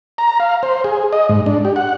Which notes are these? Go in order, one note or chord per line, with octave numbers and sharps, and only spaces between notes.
A#5
F5
C5
G#4
D#5
G#2
D4
G4
F#5